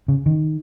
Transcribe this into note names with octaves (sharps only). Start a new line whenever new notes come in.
C#3
D#3